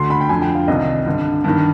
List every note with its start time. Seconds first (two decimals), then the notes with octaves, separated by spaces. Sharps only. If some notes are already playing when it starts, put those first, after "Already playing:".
Already playing: D2 D3 C6
0.10 B5
0.21 G5
0.29 F2 D3 G#5
0.42 G5
0.55 F5
0.68 C2 C3 D#3 D#5
1.06 G2 D3
1.44 G2 D#3